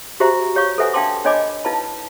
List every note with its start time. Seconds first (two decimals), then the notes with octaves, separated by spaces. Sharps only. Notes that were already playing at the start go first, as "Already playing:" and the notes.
0.20 F#4 G4 C5 E5 A#5
0.55 G4 C#5 F5 C#6
0.78 A4 B4 C5 E5 F#5 G#5
0.93 D4 F5 G5 A5 C6 D6
1.25 D4 C#5 D#5 G#5 B5 D6
1.65 D#4 E4 B4 F5 A5 B5